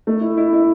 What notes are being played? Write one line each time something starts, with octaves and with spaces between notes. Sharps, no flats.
A3
E4
E4
E4